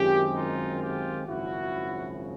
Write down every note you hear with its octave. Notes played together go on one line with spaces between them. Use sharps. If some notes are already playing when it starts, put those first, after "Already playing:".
Already playing: F#2 D#3 G#3 C4 F4 G4
D#4 F4
F4 G4
G#1 F#2 C#3 F3 E4 F#4